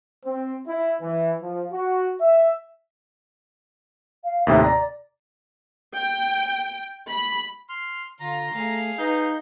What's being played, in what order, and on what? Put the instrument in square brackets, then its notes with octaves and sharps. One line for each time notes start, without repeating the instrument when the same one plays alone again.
[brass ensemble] C4
E4
E3
F3
F#4
E5
[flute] F5
[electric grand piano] D#2 A2 C3 [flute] E5
[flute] D5 [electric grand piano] A#5
[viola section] G5
B5
[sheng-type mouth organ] C6 F6
[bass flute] D3 [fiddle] F4 [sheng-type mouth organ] A#5
[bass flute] A3 [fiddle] G#4 F5
[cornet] D#4 [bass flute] B4 [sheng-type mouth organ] G6